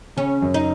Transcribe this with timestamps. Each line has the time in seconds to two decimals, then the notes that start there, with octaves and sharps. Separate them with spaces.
0.17 C#3 C#4
0.42 F#2
0.54 D#4